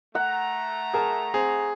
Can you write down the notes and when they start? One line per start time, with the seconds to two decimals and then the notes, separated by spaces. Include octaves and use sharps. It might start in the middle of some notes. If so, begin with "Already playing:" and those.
0.15 A3 F#5 A#5
0.93 G#4 A#4 A5
1.34 C4 G#4